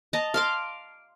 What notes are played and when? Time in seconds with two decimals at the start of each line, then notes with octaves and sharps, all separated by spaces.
0.13 D#5 A5 A#5
0.34 F5 C6 D6